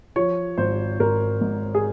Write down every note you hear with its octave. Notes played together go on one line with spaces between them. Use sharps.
F3 C#5
G#1 C5
G#1 A#4
G#2
G#4